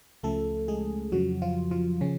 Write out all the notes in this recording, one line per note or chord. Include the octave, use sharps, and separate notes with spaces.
C#2 C#3 F3 A3 A4
G#3 G#4
F2 C#3 F3 F#3 F#4
F3 F4
F3 F4
C#3 F3 C#4